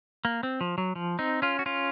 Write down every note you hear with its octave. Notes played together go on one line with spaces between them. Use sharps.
A#3
C4
F3
F#3
F3
C4 D#4
C#4 F4
F#4
C#4 F4